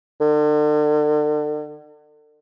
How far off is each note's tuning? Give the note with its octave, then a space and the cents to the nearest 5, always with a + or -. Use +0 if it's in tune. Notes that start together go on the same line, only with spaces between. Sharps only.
D3 +40